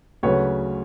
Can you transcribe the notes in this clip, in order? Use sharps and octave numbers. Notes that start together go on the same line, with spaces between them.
D2 C#3 F#3 B4 C#5